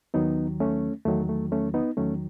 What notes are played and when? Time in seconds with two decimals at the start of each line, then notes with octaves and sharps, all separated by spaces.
0.14 D#2 D#3 F#3 B3 D#4
0.60 A3 C#4
1.05 E2 D#3 F#3 A3
1.29 A3
1.52 A3 C#4
1.74 B3 D#4
1.97 E2 D#3 F#3 A3 C#4